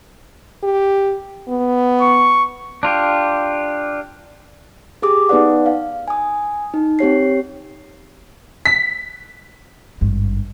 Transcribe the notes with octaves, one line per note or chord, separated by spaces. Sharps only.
G4
B3
C#6
D4 F4 G4
G4 G#4 D6 D#6
B3 D#4 B4 D5 F#5
F5
G#5 D#6
D#4
C4 G4 C#5 C7
B6
G#1 G2